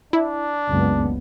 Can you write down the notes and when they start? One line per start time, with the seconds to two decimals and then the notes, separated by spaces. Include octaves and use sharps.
0.13 D4 E4
0.68 F#1 C#2 B3